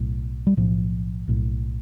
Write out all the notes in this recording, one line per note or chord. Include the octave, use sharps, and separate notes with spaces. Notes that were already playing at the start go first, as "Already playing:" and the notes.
Already playing: B1 A2
G3
B1 A2 F3
B1 A2